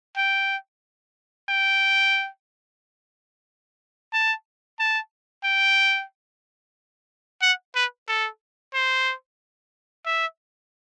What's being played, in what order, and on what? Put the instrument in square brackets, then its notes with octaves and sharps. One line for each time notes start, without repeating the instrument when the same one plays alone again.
[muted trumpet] G5
G5
A5
A5
G5
F#5
B4
A4
C5
E5